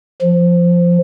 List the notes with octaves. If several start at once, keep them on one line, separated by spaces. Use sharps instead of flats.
F3